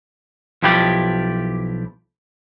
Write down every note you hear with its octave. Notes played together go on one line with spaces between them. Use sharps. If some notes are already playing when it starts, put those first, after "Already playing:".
B1 F3 E4 G4 B4 D5